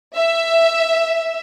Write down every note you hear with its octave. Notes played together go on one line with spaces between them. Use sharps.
E5